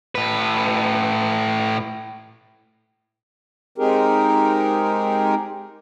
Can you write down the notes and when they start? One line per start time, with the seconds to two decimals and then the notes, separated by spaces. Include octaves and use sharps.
0.15 A2 B4
3.78 G#3 C4 D#4 G4 G#4 A#4